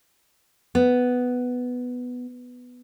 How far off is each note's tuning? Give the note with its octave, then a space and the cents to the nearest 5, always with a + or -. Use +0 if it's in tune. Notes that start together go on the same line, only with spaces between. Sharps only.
B3 +5